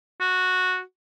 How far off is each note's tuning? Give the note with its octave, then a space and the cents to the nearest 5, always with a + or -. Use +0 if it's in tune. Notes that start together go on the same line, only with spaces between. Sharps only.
F#4 -10